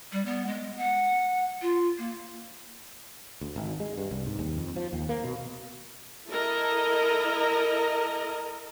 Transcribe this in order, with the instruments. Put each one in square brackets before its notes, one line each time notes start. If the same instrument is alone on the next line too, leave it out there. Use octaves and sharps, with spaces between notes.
[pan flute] G3
B3
G#3
F#5
F4
A#3
[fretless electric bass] D2
G#1
G#3
G2
C2
G#2
D#2
F2
F3
D#2
A#3
B2
[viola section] E4 A4 A#4 D#5